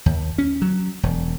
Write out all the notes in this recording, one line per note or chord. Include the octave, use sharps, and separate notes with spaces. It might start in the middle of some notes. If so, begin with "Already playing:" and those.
D#2
C#4
F#3
E1